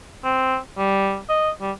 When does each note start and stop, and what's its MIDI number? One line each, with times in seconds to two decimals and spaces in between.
0.24 0.57 60
0.78 1.19 55
1.29 1.50 75
1.61 1.72 55